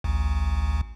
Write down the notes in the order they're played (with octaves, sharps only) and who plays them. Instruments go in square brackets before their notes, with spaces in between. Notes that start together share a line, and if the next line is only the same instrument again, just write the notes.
[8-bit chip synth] A1 D2